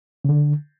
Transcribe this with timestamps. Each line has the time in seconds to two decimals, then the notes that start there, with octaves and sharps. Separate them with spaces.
0.25 C#3
0.29 D3